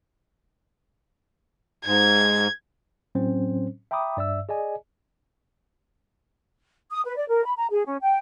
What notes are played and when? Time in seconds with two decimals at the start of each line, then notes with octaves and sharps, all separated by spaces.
1.86 G#2 G#6
3.15 A2 F#3 C4 C#4 C5
3.91 E5 G5 A#5 B5 D6 D#6
4.17 G2 D5 E5 E6
4.49 G#4 D5 D#5 G#5
6.90 D#6
7.05 B4
7.16 D5
7.28 A#4
7.44 B5
7.57 A#5
7.69 G#4
7.85 C#4
8.02 G5